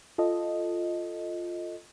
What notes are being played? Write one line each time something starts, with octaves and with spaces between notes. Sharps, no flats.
F4 A4 D#5